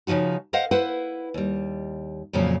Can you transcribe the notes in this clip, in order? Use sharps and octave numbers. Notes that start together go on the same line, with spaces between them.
C#3 E3 F3 D#4 F#4
A#4 C5 D#5 F5 F#5
E4 B4 C5 F#5
D#2 G3
F2 A#2 C#3 F3 F#3